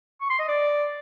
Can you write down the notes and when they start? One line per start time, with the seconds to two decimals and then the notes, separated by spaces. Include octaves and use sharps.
0.21 C#6
0.30 C6
0.39 D#5
0.48 D5